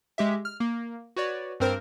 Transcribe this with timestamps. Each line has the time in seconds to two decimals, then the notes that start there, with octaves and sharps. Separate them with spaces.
0.18 G#3 G4 E5
0.45 F6
0.60 A#3
1.16 F#4 B4 C#5 D5
1.60 G2 C4 A#4 C5 F6